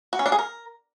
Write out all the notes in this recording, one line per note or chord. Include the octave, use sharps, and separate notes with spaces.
F#4
C#4
D4
G#4
A#4